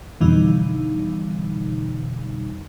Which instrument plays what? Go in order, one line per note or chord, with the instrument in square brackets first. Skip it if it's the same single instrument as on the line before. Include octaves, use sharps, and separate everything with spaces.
[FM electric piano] F2 B2 D3 E3 G3 D#4